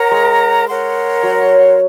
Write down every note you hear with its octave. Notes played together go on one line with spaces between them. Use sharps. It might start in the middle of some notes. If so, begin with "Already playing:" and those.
Already playing: A#4 C#5 F#5 A#5
G#3
A#4 C#5 F#5 C6
F#3